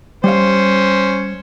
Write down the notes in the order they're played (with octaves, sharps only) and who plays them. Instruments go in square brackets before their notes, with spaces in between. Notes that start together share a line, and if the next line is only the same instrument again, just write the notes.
[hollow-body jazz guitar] G3 F5 [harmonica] C#4 C5